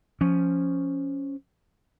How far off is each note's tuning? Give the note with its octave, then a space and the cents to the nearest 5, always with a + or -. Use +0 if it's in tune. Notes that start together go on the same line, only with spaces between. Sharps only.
F3 +0 C#4 +0